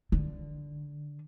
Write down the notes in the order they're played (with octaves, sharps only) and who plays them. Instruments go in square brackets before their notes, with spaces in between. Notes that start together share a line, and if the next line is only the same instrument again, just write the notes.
[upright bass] D3